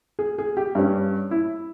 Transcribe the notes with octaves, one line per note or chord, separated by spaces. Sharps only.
G#4
G#4
G4
G2 G3 C#4
E4